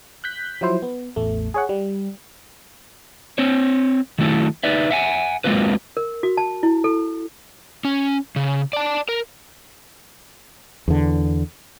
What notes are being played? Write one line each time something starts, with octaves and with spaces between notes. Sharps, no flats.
F#6 G6 B6
F3 F#3 E4 C5
B3
A1 E2 A3
G#4 C#5 F#5
G3
C4 C5 C#5
D#3 F#3 A3 E4 A4
D#4 B4 D5 E5
E5 F#5 G#5
F#3 G#3 A#3 C4 F4 B4
A#4
F#4
A5
E4
A4
C#4
C#3
D5 A5
A#4
E2 D3